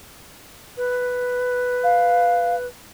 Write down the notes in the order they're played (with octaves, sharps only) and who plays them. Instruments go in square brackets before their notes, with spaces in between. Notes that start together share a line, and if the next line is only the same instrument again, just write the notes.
[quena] B4
[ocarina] F5